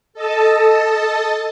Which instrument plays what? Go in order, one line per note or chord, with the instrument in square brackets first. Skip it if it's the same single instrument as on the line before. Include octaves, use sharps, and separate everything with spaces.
[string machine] A4 D#5 A5